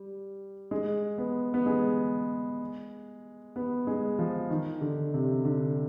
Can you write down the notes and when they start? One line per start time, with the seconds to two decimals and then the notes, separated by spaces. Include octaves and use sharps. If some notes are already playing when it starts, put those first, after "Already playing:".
Already playing: G3
0.71 G#3
1.18 B3
1.54 B3
1.66 G#3
3.56 B3
3.87 G#3
4.19 F3
4.50 D#3
4.81 D3
5.14 C3
5.45 D3